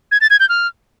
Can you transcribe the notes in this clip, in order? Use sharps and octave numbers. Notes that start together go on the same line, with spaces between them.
G#6
A6
G#6
G6
F6